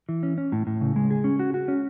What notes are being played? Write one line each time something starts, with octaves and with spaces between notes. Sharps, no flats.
E3
C#4
C#4
A2
A2
C#3
G#3
G#4
C#4
F#4
F#4
C#4